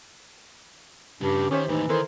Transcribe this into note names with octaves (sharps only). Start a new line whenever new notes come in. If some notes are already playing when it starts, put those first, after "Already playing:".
G2 C#3 G3 G4
D#3 C#4 G4 C5 C#5 E5
D#2 A2 E3 D#4
D#3 E4 A4 A#4 C5